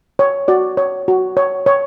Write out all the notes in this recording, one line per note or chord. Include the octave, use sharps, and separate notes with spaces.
C#5
F#4 D5
C#5
F#4
C#5
C#5